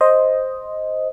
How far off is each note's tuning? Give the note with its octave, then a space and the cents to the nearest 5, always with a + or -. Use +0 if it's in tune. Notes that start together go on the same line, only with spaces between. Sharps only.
C5 +0 D#5 +0